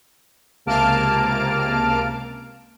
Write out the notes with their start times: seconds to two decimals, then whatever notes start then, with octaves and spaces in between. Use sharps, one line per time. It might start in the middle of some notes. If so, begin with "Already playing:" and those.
0.66 C#2 C3 A#3 A5 F6 D7